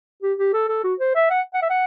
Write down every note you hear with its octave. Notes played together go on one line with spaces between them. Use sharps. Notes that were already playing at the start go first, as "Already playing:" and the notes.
G4
G4
A4
A4
F#4
C5
E5
F#5
F#5
E5
F#5